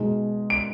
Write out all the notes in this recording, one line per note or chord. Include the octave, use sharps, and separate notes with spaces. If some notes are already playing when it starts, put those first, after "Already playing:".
Already playing: B2 G#3 D#4
D7